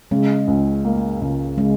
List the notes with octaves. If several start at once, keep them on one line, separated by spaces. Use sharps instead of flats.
C#3 G#3
C#2
A#3
C#2
C#3 G#3